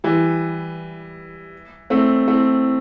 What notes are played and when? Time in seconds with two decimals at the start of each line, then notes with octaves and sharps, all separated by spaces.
0.04 E3 G3
1.90 A3 C4
2.28 A3 C4